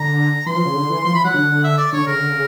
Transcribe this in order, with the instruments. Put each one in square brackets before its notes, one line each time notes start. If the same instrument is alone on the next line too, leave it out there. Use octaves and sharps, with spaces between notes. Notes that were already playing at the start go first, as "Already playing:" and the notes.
Already playing: [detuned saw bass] D3 [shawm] A#5
[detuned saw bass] E3 [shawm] C6
[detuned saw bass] F3
C#3
D3
E3
[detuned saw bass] F3 [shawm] C6
[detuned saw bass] E3 [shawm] B5
[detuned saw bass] F#3 [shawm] F#5
[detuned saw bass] D3
[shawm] E5
D5
[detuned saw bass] D3 [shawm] C#5
[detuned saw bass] C#3 [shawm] A#4
[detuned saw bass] D3
C#3